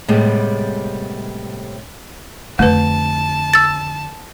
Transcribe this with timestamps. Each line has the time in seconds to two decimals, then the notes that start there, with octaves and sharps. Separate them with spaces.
0.08 A2 C3 G3 G#3 B3 C4
2.59 F2 D3 A3 B4 A5
3.54 E6 A6